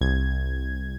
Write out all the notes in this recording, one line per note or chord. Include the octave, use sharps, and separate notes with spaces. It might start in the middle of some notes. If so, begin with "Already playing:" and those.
C2 G#6